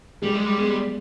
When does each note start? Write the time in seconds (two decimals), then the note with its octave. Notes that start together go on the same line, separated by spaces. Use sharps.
0.22 G3 G#3
0.34 G#3
0.46 G3
0.57 G#3 B3
0.70 G3